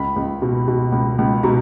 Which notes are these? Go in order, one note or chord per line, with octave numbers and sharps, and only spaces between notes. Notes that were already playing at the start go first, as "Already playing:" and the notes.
Already playing: C#2 B5
C#2
B2
B2
C#2
C#2
B2 A#5